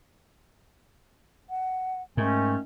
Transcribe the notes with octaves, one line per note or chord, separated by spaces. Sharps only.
F#5
G#2 D#3 A3 C#4 G#5